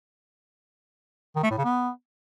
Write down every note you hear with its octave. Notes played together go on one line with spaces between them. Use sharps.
D#3
A3
A2
C#3
B3